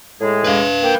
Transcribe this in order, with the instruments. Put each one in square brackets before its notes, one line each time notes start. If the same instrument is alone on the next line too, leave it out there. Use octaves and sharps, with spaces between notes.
[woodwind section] A2 G#3 G#4
[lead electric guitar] B4 F5
[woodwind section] A#3 G5